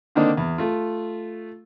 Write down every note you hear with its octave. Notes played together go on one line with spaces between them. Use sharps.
D3 D#3 A#3 C4 D4 D#4
E2
A3 F4